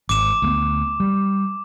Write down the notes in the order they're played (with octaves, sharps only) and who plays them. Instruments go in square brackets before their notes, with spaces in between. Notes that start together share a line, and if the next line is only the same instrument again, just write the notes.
[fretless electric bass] G#1 [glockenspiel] D6 E7
[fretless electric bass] D2 G#3 B3
G3